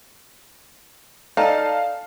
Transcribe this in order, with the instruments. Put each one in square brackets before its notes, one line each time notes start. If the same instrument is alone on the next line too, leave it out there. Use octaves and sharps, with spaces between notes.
[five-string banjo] D#4 [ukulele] A4 D5 G#5 [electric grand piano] F5 A5 F6